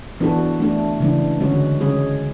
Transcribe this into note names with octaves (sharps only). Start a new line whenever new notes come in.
E3 B3 D4 F#4 A4
A3 D4 A4
C#3 E3 G#3 D4
D3 G#3 C#4 F#4
C#3 G#3 C#4 G#4